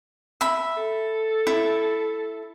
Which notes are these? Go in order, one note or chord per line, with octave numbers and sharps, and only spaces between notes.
E5 B5
A4
E4